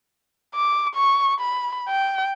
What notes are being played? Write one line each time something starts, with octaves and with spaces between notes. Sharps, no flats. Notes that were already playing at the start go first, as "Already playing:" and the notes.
D6
C#6
B5
G5